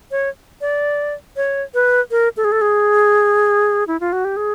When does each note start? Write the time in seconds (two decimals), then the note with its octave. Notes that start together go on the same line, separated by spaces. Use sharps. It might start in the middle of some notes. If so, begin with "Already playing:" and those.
0.11 C#5
0.61 D5
1.36 C#5
1.74 B4
2.11 A#4
2.37 A4
2.44 G#4
2.52 A4
2.61 G#4
3.87 E4
4.00 F4
4.13 F#4
4.25 G4
4.37 G#4